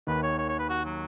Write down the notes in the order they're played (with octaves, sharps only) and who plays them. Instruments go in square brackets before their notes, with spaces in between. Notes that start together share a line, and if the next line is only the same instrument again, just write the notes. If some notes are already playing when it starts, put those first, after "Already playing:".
[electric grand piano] D#2 D#3 [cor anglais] B4
[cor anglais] C#5
C#5
C#5
B4
F#4
F#3